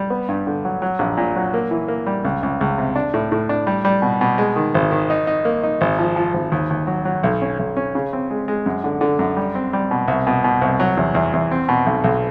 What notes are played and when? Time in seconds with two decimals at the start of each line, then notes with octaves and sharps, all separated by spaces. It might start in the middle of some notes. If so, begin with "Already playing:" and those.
Already playing: G3
0.10 B3
0.29 G2
0.47 D3
0.65 F#3
0.82 F#3
0.99 A#1
1.17 A#2
1.36 F#3
1.54 A#3
1.71 E3
1.88 A#3
2.06 G3
2.24 C#2
2.43 C#2
2.61 C#2
2.78 C3
2.96 D4
3.14 A2
3.32 A2
3.49 D4
3.67 G3
3.85 G3
4.02 B2
4.21 B2
4.38 G#3
4.56 D#3
4.74 G#1
4.91 D#3
5.10 D#4
5.27 D#4
5.45 A#3
5.63 D#4
5.81 G#1
5.99 F3
6.16 F3
6.34 G#1
6.52 D#2
6.70 D#2
6.87 F#3
7.05 F#3
7.23 B1
7.42 C#4
7.59 B1
7.77 C#4
7.95 C#3
8.13 C4
8.31 G#3
8.48 G#3
8.66 F#2
8.84 D3
9.01 D3
9.19 F#2
9.37 G3
9.55 C4
9.73 G3
9.91 B2
10.08 C2
10.27 B2
10.44 B2
10.61 C2
10.80 F#3
10.97 E2
11.15 E2
11.33 E2
11.51 C4
11.69 B2
11.86 B1
12.04 B1